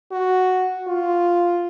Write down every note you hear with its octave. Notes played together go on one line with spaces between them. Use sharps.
F#4
F4